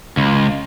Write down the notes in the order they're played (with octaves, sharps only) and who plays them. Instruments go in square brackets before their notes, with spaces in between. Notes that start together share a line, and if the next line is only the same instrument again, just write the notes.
[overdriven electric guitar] C#2